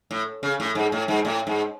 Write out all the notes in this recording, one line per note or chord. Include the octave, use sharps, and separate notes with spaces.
A2
C#3
A2
G#2
A2
G#2
A2
G#2